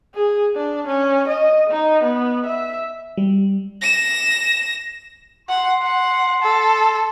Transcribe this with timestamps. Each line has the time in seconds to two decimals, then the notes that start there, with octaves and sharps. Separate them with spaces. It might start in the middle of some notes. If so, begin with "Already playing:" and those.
0.15 G#4
0.56 D4
0.87 C#4
1.28 D#5
1.70 D#4
2.04 B3
2.46 E5
3.17 G3
3.81 A#6 E7
5.49 F#5 C6
5.82 F#5
6.42 A4